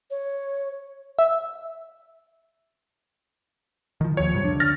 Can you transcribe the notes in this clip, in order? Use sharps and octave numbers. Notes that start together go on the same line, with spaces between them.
C#5
E5
D#3 F3
D#2 F3 C#5
F#2 C3 G3
D2 D4
F6 A6 A#6